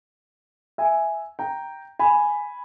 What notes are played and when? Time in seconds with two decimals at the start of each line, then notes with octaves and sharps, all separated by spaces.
0.78 E5 G#5
1.39 G5 A#5
1.99 G#5 B5